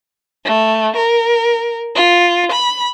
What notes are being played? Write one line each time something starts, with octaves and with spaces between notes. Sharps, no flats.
A3
A#4
F4
B5